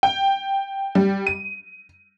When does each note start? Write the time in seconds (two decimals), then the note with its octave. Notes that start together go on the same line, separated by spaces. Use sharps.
0.03 G5
0.95 G3
1.27 D#7